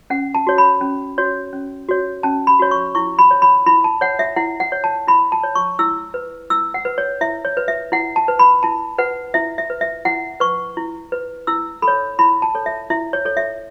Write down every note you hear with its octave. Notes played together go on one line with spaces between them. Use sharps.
C#4 F#5
A5
F#4 C#5
B5
C#4
F#4 C#5
C#4
F#4 C#5
C#4 A5
B5
F#4 C#5
C#6
E4 C#6
B5
C#5
B5
E4 B5
A5
C#5 F#5
E5
E4 F#5
F#5
C#5
A5
E4 B5
A5
C#5
C#6
E4 E6
B4
E4 E6
F#5
B4
C#5
E4 E5
C#5
B4
E5
E4 F#5
A5
B4
B5
E4 A5
B4 F#5
E4 E5
E5
B4
E5
E4 F#5
B4 C#6
E4
B4
E4 E6
A4 B5
C#5
E4 B5
A5
A4 C#5
E5
E4 E5
C#5
A4 C#5
E5